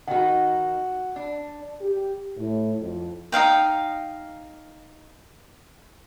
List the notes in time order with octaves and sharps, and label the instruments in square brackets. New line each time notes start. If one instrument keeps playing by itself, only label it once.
[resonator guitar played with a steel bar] D#3 D#4 [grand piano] F#4 F#5
[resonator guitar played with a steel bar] D4
[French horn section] G4
A2
F2
[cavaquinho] D#4 F4 F5 G5